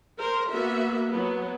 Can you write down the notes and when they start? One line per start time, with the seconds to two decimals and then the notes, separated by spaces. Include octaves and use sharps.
0.18 A#4 C5
0.50 A#3 B3 F#4 E5
1.10 F#3 B3